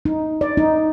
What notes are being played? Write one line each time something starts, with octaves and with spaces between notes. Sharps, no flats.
D#4
D5
D#4